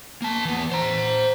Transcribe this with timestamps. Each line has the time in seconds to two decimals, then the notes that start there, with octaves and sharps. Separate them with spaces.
0.22 A#3 A5
0.45 E3 B3
0.72 C5 A#5